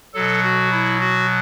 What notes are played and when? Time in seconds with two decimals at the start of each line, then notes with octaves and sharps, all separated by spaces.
0.14 B2 F#3 A4
0.44 F#4
0.72 E4
1.00 F#4